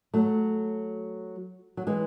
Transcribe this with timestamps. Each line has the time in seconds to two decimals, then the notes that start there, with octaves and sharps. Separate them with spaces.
0.14 F#3 A3
1.77 F#3
1.87 E3 G#3